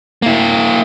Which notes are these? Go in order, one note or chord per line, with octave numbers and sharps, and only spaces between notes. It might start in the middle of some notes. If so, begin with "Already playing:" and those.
A#3 E4